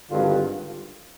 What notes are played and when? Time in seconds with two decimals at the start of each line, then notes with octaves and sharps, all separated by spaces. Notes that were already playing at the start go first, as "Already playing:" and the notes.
0.10 G#1 G2 D3 F4